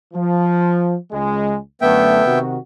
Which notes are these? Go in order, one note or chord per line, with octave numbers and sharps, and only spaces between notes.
F3
C#2 G#3
F#2 D3 A3 B3 E5 G5
C3 D#3 F#4